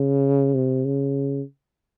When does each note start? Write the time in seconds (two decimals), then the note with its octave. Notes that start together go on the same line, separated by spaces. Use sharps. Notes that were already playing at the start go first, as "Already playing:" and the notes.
Already playing: C#3
0.55 C3
0.85 C#3